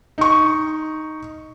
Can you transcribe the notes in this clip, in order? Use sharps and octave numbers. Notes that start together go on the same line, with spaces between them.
D#4 C#6